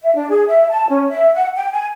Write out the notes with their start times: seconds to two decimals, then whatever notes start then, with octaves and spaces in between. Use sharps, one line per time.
0.03 E5
0.15 D4
0.30 G#4
0.47 E5
0.70 A5
0.89 C#4
1.10 E5
1.34 F#5
1.56 G5
1.72 G#5